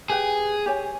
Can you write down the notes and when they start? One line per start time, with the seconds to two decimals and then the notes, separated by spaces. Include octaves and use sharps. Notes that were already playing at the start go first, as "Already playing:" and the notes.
0.10 G4 G#4 B4 G5
0.66 G4 C#5 G#5